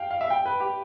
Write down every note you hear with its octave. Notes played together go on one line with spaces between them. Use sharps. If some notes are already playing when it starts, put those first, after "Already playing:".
Already playing: F5 G5
F5
E5
G5
B4
G4